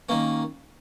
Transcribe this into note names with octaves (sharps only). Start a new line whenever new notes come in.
D#3 A#3 C#4